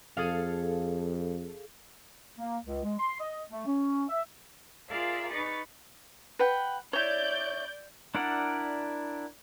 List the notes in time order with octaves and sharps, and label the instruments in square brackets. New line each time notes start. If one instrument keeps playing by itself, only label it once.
[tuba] F2 [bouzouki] G#4 A4 F5
[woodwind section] A#3
C#2
G#3
C6
D#5
A3
C#4
E5
[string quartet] F4 G#4 A#4 D5 E5 F5
D#4 B4 C#6 A6
[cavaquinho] B4 F#5 G5
[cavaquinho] E4 C#5 [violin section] D5 G6
[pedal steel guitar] D4 E4 A#4 D5 F#5